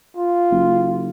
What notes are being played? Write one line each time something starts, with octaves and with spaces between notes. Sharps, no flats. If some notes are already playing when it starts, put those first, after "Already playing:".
F4
F#1